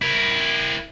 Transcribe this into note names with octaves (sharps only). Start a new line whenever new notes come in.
E4 A#4